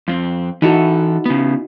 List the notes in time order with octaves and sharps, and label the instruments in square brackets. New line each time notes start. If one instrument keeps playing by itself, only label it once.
[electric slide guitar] F2 C4
[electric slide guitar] E3 A4 [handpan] D#4 E4 F#4
[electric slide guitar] C#3 B3